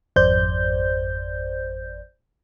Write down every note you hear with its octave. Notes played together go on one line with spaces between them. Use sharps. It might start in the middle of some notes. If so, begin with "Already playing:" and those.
G#1 F2 C5 D5 G6